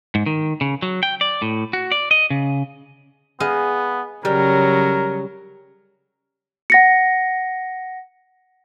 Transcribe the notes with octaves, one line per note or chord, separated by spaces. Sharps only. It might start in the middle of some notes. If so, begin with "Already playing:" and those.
G#2
D#3
C#3
F#3
G5
D5
A2
F#4
D5
D#5
C#3
B3 G#4 D#5 F5
C#3 F#3 G3 A#4
F#5 A#6 C#7